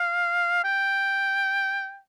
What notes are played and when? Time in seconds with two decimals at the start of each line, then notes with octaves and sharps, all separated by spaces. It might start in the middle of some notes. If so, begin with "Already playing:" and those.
Already playing: F5
0.64 G5